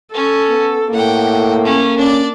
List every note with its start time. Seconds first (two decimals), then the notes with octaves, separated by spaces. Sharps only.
0.14 C#4 A4
0.49 B3
0.94 A2 A#3 F#5 G5
1.64 A3 C#4
1.98 C#4 D4 D5